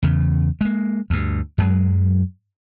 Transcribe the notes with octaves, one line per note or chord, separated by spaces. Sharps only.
E2 C#3
G#3 A#3
D2 G2
F#2 F#3 G#3